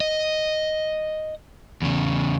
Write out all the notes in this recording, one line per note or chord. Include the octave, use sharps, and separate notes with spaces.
D#5
E2 C#3